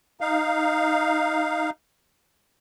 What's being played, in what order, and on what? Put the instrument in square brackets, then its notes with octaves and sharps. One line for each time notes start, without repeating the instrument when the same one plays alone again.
[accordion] D#4 F5